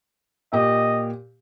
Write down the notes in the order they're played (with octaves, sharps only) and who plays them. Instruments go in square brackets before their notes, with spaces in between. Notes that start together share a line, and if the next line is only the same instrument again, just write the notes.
[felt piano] A#2 G4 [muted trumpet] D#5